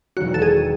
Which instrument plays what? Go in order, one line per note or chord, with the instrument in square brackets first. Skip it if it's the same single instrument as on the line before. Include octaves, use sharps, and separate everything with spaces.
[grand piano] E1 D#2 D#3 F#3 C#4 [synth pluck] F#4
[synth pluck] A4
G#4